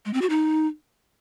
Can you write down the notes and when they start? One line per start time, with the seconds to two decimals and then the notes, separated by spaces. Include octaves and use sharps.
0.05 G#3
0.13 C4
0.22 F#4
0.30 D#4